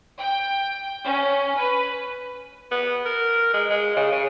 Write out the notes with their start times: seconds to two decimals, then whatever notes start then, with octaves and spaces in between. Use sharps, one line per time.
0.18 G5
1.05 C#4
1.58 B4
2.71 B3
3.05 A#4
3.54 G#3
3.70 G#3
3.96 C#3
4.12 C#3